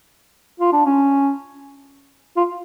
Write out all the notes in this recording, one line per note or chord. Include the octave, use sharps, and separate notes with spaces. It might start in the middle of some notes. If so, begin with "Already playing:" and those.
F4
D4
C#4
F4